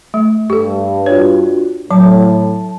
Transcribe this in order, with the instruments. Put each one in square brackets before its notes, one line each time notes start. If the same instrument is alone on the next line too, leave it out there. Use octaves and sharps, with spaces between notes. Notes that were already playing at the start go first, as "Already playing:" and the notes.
[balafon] A3
[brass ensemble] G2 [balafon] G4 A4
[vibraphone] D4 F4 F#4 [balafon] C#5
[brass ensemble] A2 [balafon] F#3 [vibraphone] A5